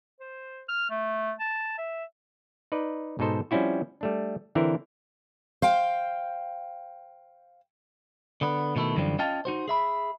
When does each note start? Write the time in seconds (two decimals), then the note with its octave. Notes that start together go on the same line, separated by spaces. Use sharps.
0.20 C5
0.69 F6
0.90 A3
1.40 A5
1.78 E5
2.72 D#4 B4 D5
3.19 G#2 B2 D#4 A4 C5
3.51 F3 G3 C4 C#4 E4 F#4
4.01 G3 A3 D4
4.55 D3 E3 C4 E4 A#4
5.62 C5 F5 G5
8.41 D3 B3
8.76 B2 D#3 A3 E4
8.96 F#2 D3 E3 F3 G3
9.19 C#4 F4 D#5 F5 G5 A5
9.45 D#4 F#4 C5
9.68 G#4 E5 B5